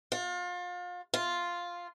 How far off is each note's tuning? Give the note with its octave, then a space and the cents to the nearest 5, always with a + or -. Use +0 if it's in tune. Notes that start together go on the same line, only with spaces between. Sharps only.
F4 +35
F4 +0